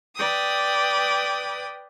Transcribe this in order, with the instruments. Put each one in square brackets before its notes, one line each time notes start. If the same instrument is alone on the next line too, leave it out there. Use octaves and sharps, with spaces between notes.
[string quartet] B4 D5 G5 D#6